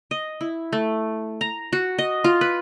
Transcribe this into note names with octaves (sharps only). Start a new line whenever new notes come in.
D#5
E4
A3
A#5
F#4
D#5
F4
B4